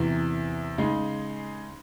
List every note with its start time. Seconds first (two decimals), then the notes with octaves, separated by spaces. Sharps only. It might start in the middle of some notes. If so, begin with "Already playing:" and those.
Already playing: E2 C3 E3
0.78 C#3 G#3 D#4